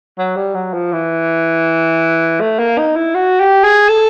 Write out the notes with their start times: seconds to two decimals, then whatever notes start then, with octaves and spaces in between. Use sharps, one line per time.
0.18 F#3
0.36 G3
0.55 F#3
0.73 F3
0.93 E3
2.41 A3
2.59 A#3
2.78 D#4
2.96 E4
3.15 F#4
3.40 G4
3.64 G#4
3.89 A4